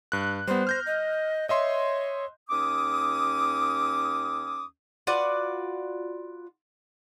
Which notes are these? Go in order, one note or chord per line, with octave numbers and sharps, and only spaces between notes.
G2 F#6
G3 B3 C5
F6 G6 A#6
D#5
C#5 D#5 E5 C6
D#2 C#4 D6 D#6
F4 F#4 B4 D5